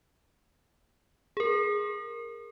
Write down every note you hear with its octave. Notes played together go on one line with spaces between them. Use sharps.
G#4 A#4